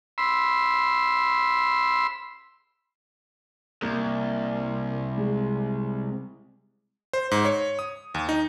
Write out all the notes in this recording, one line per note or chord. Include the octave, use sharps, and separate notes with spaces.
B5 C6 E6
C2 A#3
G#3
C5
G#2
C#5
D#6
D#2
D#4